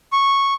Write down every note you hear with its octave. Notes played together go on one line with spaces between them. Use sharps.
C#6